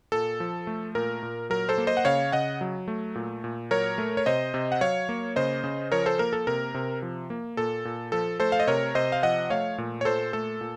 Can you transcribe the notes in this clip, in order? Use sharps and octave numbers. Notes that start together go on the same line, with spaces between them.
A#2 A4
F3
A3
A#2 A#4
A#2
F#3 A#4
A4 C5
A#3
C5 D#5
F#5
C#3 C#5 F5
C#3 D#5 F#5
F#3
A3
A#2
A#2
F#3 A#4 C#5
A3
C#5
C3 C5 D#5
C3
F#5
F#3 C#5 F5
A#3
C#3 C5 D#5
C#3
F3 A#4 C#5
A4 C5
A#3 A#4
A4
C3 A#4
C3
F3
A#3
A#2 A4
A#2
F3 A4
A3 A4 C5
F5
D#5
C3 A#4 C#5
C3 C5 D#5
F5
F3 D#5 F#5
A3 C#5 F5
A#2
C#5
A#2 A4 C5
A3 A4
A#2